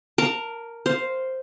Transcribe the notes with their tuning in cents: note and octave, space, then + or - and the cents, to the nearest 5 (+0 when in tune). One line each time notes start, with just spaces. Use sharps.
A#4 +0 A5 +25
C5 +0 F5 +0